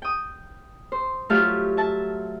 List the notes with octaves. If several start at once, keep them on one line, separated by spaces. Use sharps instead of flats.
G5 D#6
C5
F#3 A3 F4 G4 E5 F5
E5 A5